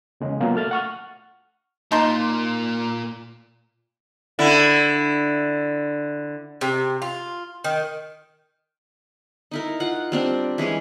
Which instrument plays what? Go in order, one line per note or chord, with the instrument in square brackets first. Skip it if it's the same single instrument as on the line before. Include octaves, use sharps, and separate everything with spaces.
[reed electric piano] E2 C#3 G#3
B2 F#3 A#3 F4
A3 F6 A6
F#5 C#6 F6
[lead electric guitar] A#2 A#3 [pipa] D#4 A5 C6
[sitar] D3 E4
[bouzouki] C3
F4
D#3
[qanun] D#4 E4 A#4
F4 F#5
G3 C4 D4
E3 G#3 C#4 G#4